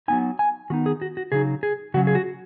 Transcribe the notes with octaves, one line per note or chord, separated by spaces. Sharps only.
F#3 B3 D#4 G#5
G#5
D#3 B3 D#4 F#4
G#4
F#4
F#4
C#3 F#3 D#4 G#4
G#4
C#3 F#3 C#4 F#4
G#4
F#4